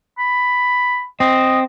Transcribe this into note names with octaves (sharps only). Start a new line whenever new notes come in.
B5
C4 D#5